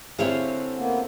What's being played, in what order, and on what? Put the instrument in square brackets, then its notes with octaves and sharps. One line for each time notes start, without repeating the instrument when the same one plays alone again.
[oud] D3 E4 G4 [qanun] C4 C#5 F5 [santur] G#4 E5
[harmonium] A#3 B3